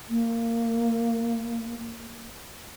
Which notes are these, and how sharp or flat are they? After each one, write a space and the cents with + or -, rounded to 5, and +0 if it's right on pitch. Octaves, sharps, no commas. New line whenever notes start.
A#3 -20